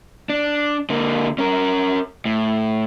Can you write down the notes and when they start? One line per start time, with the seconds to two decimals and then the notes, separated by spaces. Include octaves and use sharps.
0.30 D4
0.90 D3 A#3
1.38 C#4 A#4
2.25 A2